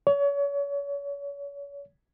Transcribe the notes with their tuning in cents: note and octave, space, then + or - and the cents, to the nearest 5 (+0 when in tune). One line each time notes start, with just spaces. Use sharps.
C#5 +35